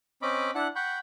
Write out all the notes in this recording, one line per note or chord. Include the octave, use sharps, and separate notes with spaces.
C4 C#4 D#5 B5 D6
D4 E4 F#5 F#6
F#5 G5 B5 C#6 G6